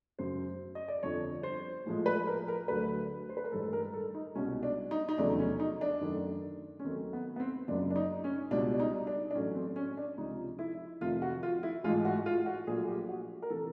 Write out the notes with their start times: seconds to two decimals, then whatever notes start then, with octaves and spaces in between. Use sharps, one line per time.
0.19 F#2 C#3 F#3 C5
0.75 D#5
0.88 D5
1.03 G1 F2 D3 C#5
1.43 C5
1.86 A#1 A2 F3 G#3
2.06 B4
2.27 A#4
2.48 A#4
2.68 D2 D3 F#3 A3 B4
3.29 C5
3.37 B4
3.44 A#4
3.51 A1 G2 D#3 G#3 A4
3.63 A4
3.73 A#4
3.93 A4
4.14 D#4
4.35 C2 B2 G#3 C#4
4.63 D4
4.91 D#4
5.08 D#4
5.18 F1 E2 C#3 F#3 A3 D4
5.39 C#4
5.59 D#4
5.81 D4
6.01 F#2 D#3 F#3 A3
6.79 C#4
6.84 D#2 D#3 F#3 A3 C4
7.13 B3
7.36 B3
7.40 C4
7.68 F#1 F#2 C#3 D4
7.90 D4
7.96 D#4
8.24 C#4
8.51 C#2 B2 G3 D4
8.72 D4
8.80 D#4
9.07 D4
9.30 D4
9.35 A1 A2 F#3 A3 C#4
9.55 C4
9.76 C#4
9.97 D4
10.17 C#2 C3 F3 D#4
10.59 E4
11.01 F1 F2 C3 D#3 F4
11.22 F#4
11.43 F4
11.63 E4
11.84 A1 G#2 E3 G#3 F4
12.05 F#4
12.26 F4
12.46 F#4
12.67 A#1 A#2 F#3 A3 G#4
12.88 G4
13.09 F#4
13.42 A#4
13.50 C3 E3 A4